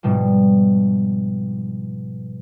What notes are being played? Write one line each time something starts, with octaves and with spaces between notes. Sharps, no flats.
G#2 B2 F3 G3